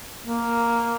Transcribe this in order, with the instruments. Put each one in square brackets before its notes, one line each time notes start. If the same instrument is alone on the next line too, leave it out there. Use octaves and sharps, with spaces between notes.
[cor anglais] A#3